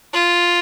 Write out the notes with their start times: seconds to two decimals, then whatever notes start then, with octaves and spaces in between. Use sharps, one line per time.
0.13 F4